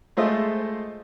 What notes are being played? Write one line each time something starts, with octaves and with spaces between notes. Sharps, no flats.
G#3 A3 F4 C5 D#5 E5